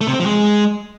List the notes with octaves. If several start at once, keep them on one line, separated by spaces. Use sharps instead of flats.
A3
C3
C4
F3
G#3